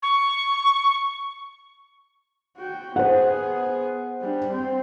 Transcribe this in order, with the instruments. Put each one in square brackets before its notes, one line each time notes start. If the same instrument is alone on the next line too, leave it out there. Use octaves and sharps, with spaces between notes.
[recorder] C#6
[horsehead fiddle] F#4 G5
[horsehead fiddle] B3 G#4 [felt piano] C5 F#5
[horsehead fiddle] G3 D4
C4